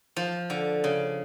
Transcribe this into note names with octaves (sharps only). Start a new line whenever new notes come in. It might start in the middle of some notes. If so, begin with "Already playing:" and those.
F3
D3
C#3